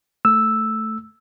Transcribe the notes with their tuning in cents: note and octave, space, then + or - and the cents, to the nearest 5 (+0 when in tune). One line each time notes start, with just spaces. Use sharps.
A3 +0 E6 +0